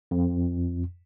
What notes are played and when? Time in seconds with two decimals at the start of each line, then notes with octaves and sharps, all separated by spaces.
0.11 F2